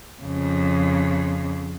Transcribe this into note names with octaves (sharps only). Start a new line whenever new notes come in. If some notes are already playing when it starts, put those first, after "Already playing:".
F2 C#3